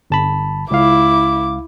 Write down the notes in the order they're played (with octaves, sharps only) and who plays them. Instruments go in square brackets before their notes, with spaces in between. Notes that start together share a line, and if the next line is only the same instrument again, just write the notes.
[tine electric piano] G1 A5 B5
[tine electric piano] C#2 F5 [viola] E4 [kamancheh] D6